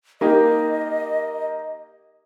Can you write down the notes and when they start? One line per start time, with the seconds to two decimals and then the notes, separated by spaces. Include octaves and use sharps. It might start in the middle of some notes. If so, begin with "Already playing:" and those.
0.21 A#3 D#4 G4 D#5